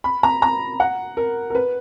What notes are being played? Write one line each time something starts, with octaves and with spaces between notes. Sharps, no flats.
B5
A#5
A#5
F#5
A#4
A#4
B4